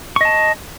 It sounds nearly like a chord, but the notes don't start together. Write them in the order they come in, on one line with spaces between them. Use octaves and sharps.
C#6 D#5 A5